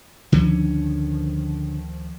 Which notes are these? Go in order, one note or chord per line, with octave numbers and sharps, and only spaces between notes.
D2 D3 D#3 F3 C#4